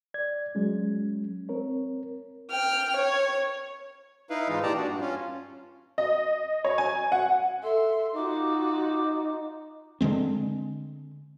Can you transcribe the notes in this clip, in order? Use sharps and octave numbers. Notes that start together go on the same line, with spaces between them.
D5 G#6
F#3 G#3 C#4
C4 A#4 C#5
G5 F6
C#5
D#4 E4 B4 F5
G#2 E3 G#3 D#4 F4
A#2 G4 D5 A5 A#5
D4 F#4
G2
C#4 F4
D#5
C#5
G#5
F#5
A4 E5 C6
D#4 F4 F#4 D6
D3 E3 G#3 C4